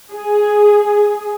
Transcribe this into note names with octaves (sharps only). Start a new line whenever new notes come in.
G#4